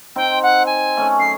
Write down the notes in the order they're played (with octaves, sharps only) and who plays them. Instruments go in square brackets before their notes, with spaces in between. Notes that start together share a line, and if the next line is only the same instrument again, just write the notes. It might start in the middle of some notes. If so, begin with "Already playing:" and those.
[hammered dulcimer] C4 D#4 C5 [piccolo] G5
[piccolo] F#5
G#5
[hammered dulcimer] A3 C#4 G#4
[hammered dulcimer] F#2 [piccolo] C7